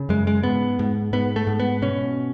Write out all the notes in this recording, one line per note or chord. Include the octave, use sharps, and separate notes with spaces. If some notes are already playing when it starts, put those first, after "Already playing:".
Already playing: C#3
F#2 G#3
G#3
G#2 B3
G#2
G#2 B3
A3
G#2
B3
B2 C#4